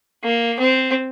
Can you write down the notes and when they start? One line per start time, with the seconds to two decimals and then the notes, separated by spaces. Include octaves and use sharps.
0.24 A#3
0.59 C4